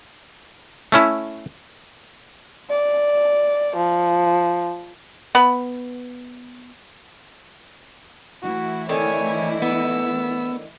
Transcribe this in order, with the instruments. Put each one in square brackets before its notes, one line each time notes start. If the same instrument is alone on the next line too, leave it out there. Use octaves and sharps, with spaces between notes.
[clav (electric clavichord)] A3 C#4 E4
[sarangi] D5
F3
[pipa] B3 B5
[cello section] E3 A3 E4 [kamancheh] F#4
[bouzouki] D3 D#3 C4 [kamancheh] C#5 G#5
[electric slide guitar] B3 [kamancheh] E6